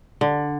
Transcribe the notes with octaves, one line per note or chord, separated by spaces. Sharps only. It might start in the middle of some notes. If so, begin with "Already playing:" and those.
D3